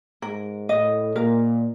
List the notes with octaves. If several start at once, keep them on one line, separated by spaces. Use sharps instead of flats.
G#2 A#4
A2 D#5
A#2 A#4